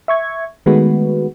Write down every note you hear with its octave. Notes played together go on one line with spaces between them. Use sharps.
E5 C#6 G#6
D#3 G#3 A3 B3 F#4 B4